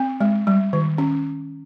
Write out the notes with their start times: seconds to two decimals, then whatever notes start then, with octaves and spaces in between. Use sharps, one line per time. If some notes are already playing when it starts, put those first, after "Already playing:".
Already playing: C4
0.21 G#3
0.47 G3
0.73 D#3
0.98 C#4